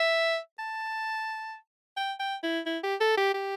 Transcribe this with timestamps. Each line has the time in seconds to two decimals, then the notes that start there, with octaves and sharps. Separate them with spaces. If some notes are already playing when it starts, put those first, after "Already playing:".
Already playing: E5
0.59 A5
1.97 G5
2.19 G5
2.43 E4
2.66 E4
2.83 G4
3.00 A4
3.17 G4
3.34 G4